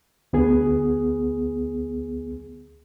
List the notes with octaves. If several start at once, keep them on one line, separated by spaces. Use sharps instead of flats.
D2 B3 G#4